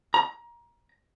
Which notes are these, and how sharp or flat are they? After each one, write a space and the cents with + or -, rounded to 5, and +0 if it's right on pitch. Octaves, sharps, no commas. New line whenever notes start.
A#5 +25